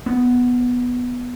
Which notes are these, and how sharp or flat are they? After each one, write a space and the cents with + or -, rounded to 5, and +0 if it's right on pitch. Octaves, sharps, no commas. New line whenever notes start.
B3 -5